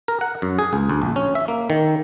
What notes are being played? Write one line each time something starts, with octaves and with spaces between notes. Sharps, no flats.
A#4
F#5
F#2
G#4
C#2
D2
A#1
C#4
E5
A#3
D#3